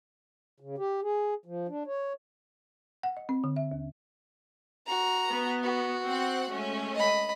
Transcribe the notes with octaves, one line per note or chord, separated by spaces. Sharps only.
C#3
G4
G#4
F3
D4
C#5
F#5
D#5
C4
D3
E5
D#2
F#4 A#5
B3
F#4
C4 F#5
G#3 A3 C#4
D#5 B5